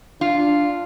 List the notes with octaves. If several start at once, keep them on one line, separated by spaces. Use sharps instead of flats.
D4 F4